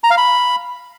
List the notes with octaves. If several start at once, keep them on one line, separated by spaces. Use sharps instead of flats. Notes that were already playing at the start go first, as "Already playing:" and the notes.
A#5
F5
B5